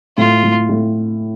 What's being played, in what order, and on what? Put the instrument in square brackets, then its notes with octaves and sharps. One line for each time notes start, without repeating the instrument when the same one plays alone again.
[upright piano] A2 [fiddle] F4
[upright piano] A2
A2